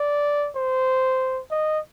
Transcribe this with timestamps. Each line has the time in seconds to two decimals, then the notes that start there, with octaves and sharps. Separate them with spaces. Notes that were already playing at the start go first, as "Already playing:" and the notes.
Already playing: D5
0.56 C5
1.51 D#5